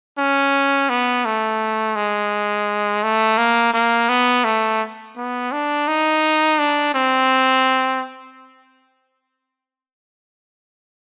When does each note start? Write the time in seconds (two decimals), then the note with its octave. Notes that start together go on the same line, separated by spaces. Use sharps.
0.18 C#4
0.90 B3
1.25 A3
1.96 G#3
3.03 A3
3.38 A#3
3.73 A#3
4.09 B3
4.44 A3
5.16 B3
5.52 D4
5.88 D#4
6.59 D4
6.94 C4